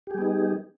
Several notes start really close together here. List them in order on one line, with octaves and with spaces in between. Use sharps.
G4 G#4 G3 B3 D#4